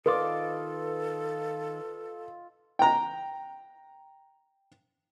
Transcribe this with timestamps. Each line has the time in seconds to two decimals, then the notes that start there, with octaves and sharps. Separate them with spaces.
0.06 D#3 F4 A4 B4 D#5 D6
2.79 G5 A#5